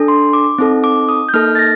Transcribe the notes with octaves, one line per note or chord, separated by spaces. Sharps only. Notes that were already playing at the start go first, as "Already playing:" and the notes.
Already playing: D4 A4
C6
D6
C4 D#4 A4
D6
D#6
G6
A#3 D#4 A4 F6
A6
A#6